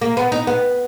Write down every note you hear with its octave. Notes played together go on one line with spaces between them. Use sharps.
A#3
B3
D#4
B3